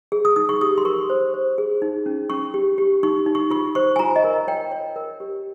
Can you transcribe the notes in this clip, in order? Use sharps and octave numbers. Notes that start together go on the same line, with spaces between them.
G#4
D#6
D#4 D#6
C#6
G4 D#6
C6
A#4 C#6
C5
C5
G#4
D#4
C#4
C#4 C#6
G4
G4
D#4 C#6
D#4
C#6
F4 C#6
C5 C#6
G#5
F4 A#5
D#5
A#4
C#5 G5
C#5
A#4
G4